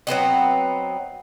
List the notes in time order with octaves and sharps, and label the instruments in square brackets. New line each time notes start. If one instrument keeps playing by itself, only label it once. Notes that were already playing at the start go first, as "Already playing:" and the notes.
[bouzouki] F#3 B3 C4 D#4